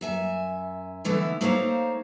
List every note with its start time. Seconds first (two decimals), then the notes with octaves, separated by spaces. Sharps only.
0.01 F#2 E5 G#5
1.04 D3 E3 A3 B3 D#4 E4
1.41 A3 A#3 D#4 C5 C#5 F5